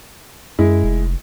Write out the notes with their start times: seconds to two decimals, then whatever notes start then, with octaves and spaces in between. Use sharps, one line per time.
0.59 F#2 G#3 E4
0.84 F1